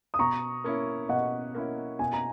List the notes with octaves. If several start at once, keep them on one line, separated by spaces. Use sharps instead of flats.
D#6
B2 A#5 C#6
A#3 C#4 E4
B2 D#5 F#5
A#3 C#4 E4
B2 G#5
A#5